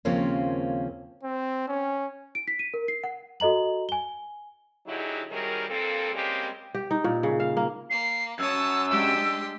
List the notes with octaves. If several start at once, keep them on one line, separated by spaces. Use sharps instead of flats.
D#2 C#3 F3 A#3 C4 C#4
C4
C#4
D7
B6
D#7
A#4
C7
F#5
F#4 A4 D#5 A#5 F#7
G#5 G7
D3 F#3 D#4 E4 G4 G#4
C3 D#3 F#3 G3 G#4 A#4
G2 A#2 A#3 C4 A4
G3 G#3 A#3 C4 C#4 G4
G4
D#4
A#2
C#3
F5
A#3
A#3 C7
F#2 C#5 A5 D#6 E6
G#3 D4 G4 C6